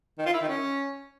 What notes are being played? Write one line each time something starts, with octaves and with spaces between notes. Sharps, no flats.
D#3
F4
E4
D#3
C#4